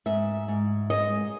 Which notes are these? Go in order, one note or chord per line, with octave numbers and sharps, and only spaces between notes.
G#2 E5
G#2
G#3 D#5